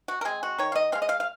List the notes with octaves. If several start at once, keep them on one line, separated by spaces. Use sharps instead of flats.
F#4
A#4
G#3 C4 G#4
F#4
D#3 C#5
F5
D#5
G#3 C4 F5
D#5
F5
F5